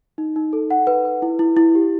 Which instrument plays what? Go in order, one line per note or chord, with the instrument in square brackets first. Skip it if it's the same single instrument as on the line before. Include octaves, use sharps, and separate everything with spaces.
[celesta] D#4
D#4
A4
F#5
B4
B4
E4
E4
E4
G4